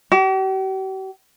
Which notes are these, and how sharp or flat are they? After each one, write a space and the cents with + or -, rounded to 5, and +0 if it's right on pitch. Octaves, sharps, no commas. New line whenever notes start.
G4 -45